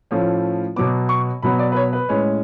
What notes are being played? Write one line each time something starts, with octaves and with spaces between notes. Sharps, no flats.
A2 F3 A3 C#4
B2 F#3 B3 D6
C#6
B2 F#3 B3 B5
D5
B4
C#5
B4
A2 G#3 C#4